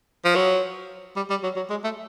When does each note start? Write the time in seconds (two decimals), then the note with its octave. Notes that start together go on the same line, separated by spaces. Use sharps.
0.25 F3
0.35 F#3
1.16 G3
1.30 G3
1.43 F#3
1.56 F#3
1.70 G#3
1.84 A3